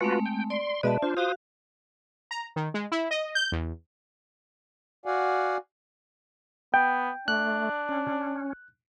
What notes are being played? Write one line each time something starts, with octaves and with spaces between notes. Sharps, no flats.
G#3 A3 C4 F4 F#4 B4
G5
D5 C6
B2 G#3 B4 D5 E5 A5
D4 F4 C5
F#4 C5 F5 D#6
A#5
D#3
G#3
E4
D#5
G6
E2
F#4 D5 F5 F#5 G#5
B3 G5
A3 D4 F#6
C#4